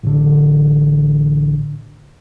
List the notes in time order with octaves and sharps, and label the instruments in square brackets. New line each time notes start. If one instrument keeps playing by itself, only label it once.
[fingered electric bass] A1 D3